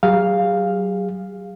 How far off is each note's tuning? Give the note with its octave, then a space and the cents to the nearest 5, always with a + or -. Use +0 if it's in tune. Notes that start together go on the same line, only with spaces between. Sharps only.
F#3 +25 G#4 -30 F5 +0